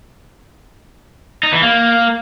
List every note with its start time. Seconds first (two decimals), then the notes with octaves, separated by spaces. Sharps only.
1.43 D#4
1.53 E3
1.62 A#3